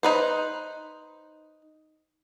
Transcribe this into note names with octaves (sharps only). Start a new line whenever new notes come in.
D#4 B4 C5